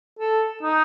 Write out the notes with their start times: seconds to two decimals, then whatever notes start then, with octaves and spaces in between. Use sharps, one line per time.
0.19 A4
0.63 D#4